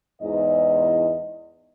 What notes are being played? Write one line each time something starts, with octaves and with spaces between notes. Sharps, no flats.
E2 G#2 D#5